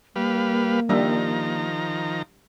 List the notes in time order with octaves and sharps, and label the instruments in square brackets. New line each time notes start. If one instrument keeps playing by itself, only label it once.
[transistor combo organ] G3 B4 F5 [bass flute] A#3
[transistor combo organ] D#3 F3 A#5 [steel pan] G3 D4 E5